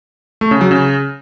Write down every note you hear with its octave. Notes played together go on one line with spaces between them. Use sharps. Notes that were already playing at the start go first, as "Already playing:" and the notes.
A3
C#3
F#3
C#3